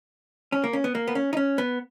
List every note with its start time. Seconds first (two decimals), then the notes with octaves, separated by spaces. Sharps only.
0.52 C#4
0.64 A#3
0.73 C#4
0.84 B3
0.95 A#3
1.08 B3
1.15 C#4
1.33 D#4
1.37 C#4
1.58 B3